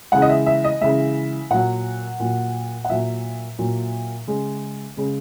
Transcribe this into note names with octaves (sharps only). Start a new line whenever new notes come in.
C#3 E3 G#3 F#5
D#5
E5
E5
D#5
C#3 E3 G#3 E5
A#2 F#3 F#5
A#2 F#3
F#5
A#2 F#3 E5
A#2 F#3
C#3 G#3
C#3 G#3